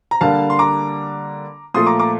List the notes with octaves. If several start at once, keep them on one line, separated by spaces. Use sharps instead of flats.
A#5
D3 G3 A#3 D4 F5 A5
C6
A#5 D6
A#2 F3 A3 C6 D#6
A#5 D6
A#5 D6